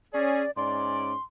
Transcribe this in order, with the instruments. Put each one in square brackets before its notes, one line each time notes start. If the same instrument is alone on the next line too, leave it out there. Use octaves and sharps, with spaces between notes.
[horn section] C#4 G#4 [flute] D5
[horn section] G#2 C#4 D5 [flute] C6